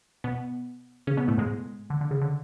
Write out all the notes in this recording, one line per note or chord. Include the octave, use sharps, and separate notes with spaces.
B2 B3
C#3 C#4
B2 B3
A2 A3
G#2 G#3
D3
D3
C#3
D3